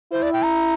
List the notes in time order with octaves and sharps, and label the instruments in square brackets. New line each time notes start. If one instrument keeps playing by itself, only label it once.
[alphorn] E4 [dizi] C5
[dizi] D5
G5
A#5